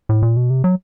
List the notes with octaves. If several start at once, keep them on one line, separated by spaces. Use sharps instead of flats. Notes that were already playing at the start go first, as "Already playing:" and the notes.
A2
A#2
B2
C3
F#3